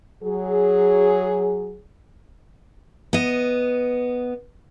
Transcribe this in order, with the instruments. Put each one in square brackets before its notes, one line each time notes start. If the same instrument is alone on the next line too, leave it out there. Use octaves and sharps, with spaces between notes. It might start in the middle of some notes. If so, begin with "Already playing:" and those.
[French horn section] F#3 G#4
[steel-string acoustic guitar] B3 D#5